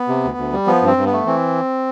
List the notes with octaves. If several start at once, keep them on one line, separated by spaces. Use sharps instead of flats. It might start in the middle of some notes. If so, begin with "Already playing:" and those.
Already playing: B3
C3
D2
D2
G3
F3 B3
G2
C4
G2
B3
A3
E3 C4